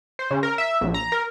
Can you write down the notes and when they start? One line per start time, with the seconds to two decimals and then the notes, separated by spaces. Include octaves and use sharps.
0.19 C5
0.31 C#3
0.43 A#4
0.58 E5
0.81 A#1
0.94 A#5
1.12 A#4